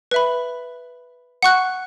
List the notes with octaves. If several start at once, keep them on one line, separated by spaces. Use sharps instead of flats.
B4 E5 B5
F#5 C#6 F#6